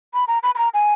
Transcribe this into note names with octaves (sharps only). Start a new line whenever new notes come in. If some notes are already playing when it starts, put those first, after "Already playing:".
B5
A#5
B5
B5
A#5
G#5